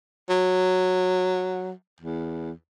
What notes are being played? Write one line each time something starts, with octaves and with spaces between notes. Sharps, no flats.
F#3
E2